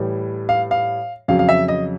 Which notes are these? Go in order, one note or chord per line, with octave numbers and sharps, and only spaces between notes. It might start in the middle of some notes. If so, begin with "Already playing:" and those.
Already playing: A2 E3 G3
F5
F5
F2 C#3 F#3 F5
F5
E5
D#5